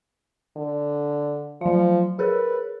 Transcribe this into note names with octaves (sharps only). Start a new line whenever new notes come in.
D3
F3 F#3 F5
G#4 A#4 B4 C#5